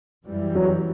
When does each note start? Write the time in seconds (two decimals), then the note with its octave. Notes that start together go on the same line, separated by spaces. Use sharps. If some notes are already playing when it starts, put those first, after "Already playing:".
0.25 F#2 E3 G3
0.55 F#3